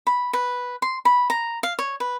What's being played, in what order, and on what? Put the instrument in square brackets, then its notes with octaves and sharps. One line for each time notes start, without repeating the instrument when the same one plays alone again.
[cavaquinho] B5
B4
C6
B5
A#5
F5
C#5
B4